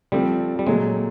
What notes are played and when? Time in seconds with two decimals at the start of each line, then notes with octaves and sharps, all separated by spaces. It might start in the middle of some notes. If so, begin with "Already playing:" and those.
0.12 F3 G3 A3 C4
0.59 G3
0.67 A#2 F#3 G#3 A3